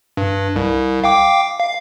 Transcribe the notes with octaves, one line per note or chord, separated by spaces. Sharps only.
G2
C2
F5 G5 D6
F5